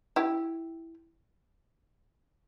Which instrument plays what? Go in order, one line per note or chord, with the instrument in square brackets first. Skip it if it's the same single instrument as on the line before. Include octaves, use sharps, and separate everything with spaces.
[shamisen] E4 G4